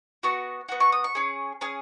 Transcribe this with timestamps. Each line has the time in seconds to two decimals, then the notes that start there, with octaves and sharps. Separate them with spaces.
0.23 B3 F#4 C#6
0.69 B3 F#4
0.80 C#6
0.92 D#6
1.04 C#6
1.15 C#4 G#4
1.61 C#4 G#4